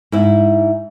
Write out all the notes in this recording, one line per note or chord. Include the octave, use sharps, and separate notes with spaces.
G#2 E4